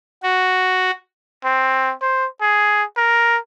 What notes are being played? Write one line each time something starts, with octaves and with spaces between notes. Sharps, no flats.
F#4
C4
C5
G#4
A#4